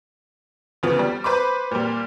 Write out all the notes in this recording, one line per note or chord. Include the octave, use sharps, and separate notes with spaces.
D2 C#3 F3 B3
G3
B4 C5 B5 D6
A#2 G3